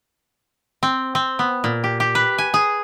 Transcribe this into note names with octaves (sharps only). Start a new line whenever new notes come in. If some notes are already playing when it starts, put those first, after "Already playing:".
C4
C4
B3
A#2
G4
G4
B4
G#5
G#4